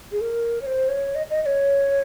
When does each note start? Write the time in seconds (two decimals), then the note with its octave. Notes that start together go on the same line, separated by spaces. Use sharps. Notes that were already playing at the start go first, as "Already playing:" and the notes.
0.12 G#4
0.21 A#4
0.62 C#5
0.66 C5
0.89 C#5
1.15 D#5
1.31 D#5
1.42 D#5
1.46 C#5